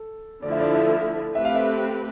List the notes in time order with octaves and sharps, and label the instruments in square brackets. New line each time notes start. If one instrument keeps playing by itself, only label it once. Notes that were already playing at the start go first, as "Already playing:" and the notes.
Already playing: [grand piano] A4
[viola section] D3 F3 A3 E4 [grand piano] D5
[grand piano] E5
D5
E5
[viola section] A3 C4 G4 B4 [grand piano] E5
[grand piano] F5
E5